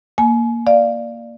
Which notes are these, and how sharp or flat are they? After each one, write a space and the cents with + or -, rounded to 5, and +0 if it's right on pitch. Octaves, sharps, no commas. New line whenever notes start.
A#3 +0 G#5 +35
D5 +10 F5 -10